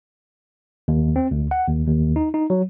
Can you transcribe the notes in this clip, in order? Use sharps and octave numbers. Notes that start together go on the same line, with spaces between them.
D#2
C4
D2
F#5
D#2
D#2
D#4
D#4
F#3